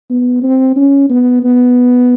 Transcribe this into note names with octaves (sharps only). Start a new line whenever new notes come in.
B3
C4
C#4
B3
B3